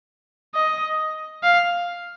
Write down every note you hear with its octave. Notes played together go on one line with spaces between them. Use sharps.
D#5
F5